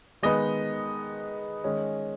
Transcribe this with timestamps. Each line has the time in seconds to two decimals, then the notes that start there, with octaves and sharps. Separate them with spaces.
0.23 D#3 G#3 B3 D#4 D#5
1.64 D#3 G#3 C#4